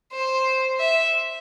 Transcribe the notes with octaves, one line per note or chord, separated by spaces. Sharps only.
C5
E5